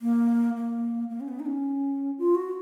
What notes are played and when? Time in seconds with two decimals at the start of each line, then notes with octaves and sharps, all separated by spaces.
0.02 A#3
0.56 A#3
1.10 A#3
1.20 C#4
1.28 B3
1.40 D#4
1.46 C#4
2.18 F4
2.35 F#4